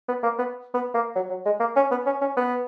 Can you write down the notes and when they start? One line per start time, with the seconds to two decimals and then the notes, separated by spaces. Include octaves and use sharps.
0.09 B3
0.23 A#3
0.39 B3
0.74 B3
0.94 A#3
1.16 F#3
1.30 F#3
1.46 G#3
1.60 A#3
1.76 C#4
1.91 B3
2.06 C#4
2.21 C#4
2.37 B3